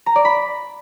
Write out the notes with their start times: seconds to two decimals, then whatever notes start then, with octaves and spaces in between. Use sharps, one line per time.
0.06 A#5
0.16 D5
0.25 B5